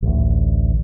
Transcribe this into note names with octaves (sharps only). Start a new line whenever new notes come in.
A1 D2